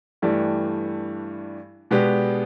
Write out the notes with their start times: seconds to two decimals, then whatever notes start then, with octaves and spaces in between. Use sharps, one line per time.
0.22 G2 E3 A3 D4 G4
1.91 B2 G#3 B3 D4 G4